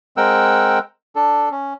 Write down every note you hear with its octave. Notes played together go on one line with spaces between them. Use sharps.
G#3 C4 A#4 F#5 G5 E6
D4 A4
C#4